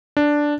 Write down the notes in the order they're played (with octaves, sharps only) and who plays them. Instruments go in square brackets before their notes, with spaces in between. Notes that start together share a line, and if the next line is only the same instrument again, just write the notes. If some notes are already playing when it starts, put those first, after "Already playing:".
[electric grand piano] D4